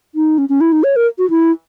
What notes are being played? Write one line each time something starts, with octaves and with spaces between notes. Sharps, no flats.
D#4
C#4
C#4
E4
D#4
C#5
A#4
F#4
E4